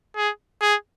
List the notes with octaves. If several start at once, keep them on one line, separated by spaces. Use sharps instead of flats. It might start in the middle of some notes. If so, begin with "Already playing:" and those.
G#4
G#4